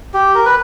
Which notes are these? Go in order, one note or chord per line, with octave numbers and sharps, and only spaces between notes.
G4
A#4
B4